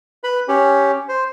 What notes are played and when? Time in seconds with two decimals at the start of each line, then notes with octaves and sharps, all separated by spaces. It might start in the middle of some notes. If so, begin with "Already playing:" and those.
0.24 B4 B5
0.48 C#4 G4
1.09 C5